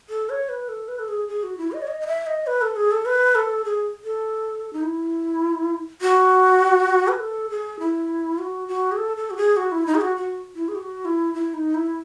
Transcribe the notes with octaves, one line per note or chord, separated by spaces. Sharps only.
A4
C#5
B4
A4
B4
A4
G#4
G#4
F#4
E4
D#5
C#5
D#5
D#5
E5
D#5
B4
A4
G#4
A4
B4
A4
G#4
A4
D#4
E4
F#4
B4
A4
G#4
E4
F#4
F#4
G#4
A4
A4
F#4
G#4
F#4
E4
D#4
G#4
F#4
F#4
E4
G#4
F#4
E4
E4
D#4
E4